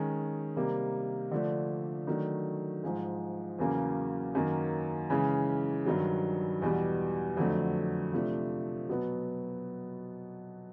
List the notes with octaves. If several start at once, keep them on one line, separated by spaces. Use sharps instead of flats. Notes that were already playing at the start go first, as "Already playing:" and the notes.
Already playing: D#3 G#3 C#4
C3 D#3 G3 A#3
D3 F3 A3 D4
D#3 F#3 A3 D4
G#2 F3 G#3
E2 C#3 F#3 A#3 C#4
F#2 D#3 F#3 A#3
C#3 E3 G#3 C#4
G2 D#3 F#3
E2 B2 G3
F2 D3 F#3 A3
C3 F3 A3 D4
B2 F#3 B3